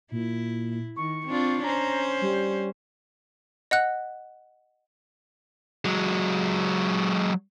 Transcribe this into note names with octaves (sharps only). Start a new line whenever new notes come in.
A#2 E4
D#3 C#6
C4 D4 F4
C#4 C5 A#5
G3
D#5 F#5 F#6
F#3 G#3